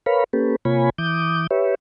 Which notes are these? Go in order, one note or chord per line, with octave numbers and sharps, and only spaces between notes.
A#4 B4 C#5 F5 B5
A#3 C#4 G4 A4 B4
C3 A#3 F4 C#5 G#5 B5
E3 D6 D#6 G6
G4 B4 C#5 E5